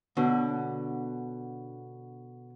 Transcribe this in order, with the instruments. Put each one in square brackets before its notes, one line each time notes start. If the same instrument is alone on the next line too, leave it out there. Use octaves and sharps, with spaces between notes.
[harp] B2 [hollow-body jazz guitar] D3